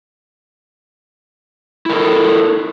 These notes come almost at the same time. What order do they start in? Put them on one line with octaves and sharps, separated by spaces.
E4 A#4 A4